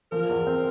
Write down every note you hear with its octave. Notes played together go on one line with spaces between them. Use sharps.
F3 A#4
E2
C4